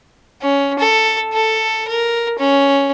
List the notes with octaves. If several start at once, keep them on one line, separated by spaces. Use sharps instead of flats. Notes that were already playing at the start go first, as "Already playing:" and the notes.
C#4
A4
A4
A#4
C#4